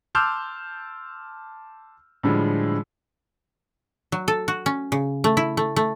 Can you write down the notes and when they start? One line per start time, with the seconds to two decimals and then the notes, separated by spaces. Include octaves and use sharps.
0.15 A5 C6 D6 E6 F6 G6
2.23 A2 D3 F3 G3 G#3
4.12 F#3
4.28 A4
4.48 F#4
4.66 C#4
4.92 C#3
5.24 A3
5.37 E4
5.57 A3
5.76 A3